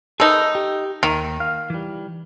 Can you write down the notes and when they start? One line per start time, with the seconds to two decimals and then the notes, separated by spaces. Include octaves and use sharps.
0.20 A3 D#4 G#4 A#4 B4
0.55 G4
1.03 D#2 D#3
1.40 F5
1.70 E3 G3